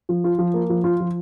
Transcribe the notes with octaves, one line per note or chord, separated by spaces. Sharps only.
F3
F4
F3
A#3
F3
F4
F3